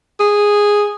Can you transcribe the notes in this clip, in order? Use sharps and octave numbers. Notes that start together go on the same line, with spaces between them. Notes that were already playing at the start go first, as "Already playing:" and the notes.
G#4